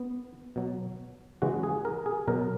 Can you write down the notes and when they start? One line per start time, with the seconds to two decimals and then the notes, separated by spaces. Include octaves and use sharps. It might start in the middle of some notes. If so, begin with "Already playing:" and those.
Already playing: B3
0.56 B2 F#3
1.42 C#3 E3 G#3 F#4
1.63 G#4
1.85 A#4
2.06 G#4
2.28 B2 F#3 A#4